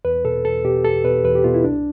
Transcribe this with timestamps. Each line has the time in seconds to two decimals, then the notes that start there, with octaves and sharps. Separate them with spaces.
0.05 E2 B4
0.25 B2 A4
0.45 E2 A4
0.65 B2 G4
0.84 E2 A4
1.04 B2 B4
1.25 E2 B4
1.35 G4
1.44 B2 F4
1.54 E4
1.64 C2 D4